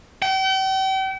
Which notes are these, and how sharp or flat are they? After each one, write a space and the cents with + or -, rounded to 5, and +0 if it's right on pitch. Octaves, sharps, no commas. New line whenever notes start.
G5 -40